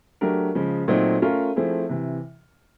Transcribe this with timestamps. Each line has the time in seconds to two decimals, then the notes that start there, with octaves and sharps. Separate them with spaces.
0.21 F#3 A3 D4 G4 A#4
0.55 C#3 F3 G#3
0.88 A#2 F#3 A3 C4 D#4
1.22 A3 C#4 F4 A#4
1.56 F3 A3 C4 E4 G#4
1.89 C3 E3